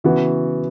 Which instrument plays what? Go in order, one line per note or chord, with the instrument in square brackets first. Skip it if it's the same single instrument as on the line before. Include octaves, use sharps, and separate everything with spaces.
[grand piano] C#3 E3 B3 F#4